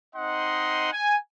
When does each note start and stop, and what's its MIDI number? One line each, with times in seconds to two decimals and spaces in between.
0.16 0.90 60
0.16 0.90 63
0.16 0.90 75
0.16 0.90 78
0.16 0.90 84
0.93 1.17 80